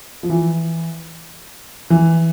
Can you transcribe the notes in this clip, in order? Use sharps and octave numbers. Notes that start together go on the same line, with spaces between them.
F3
E3
E3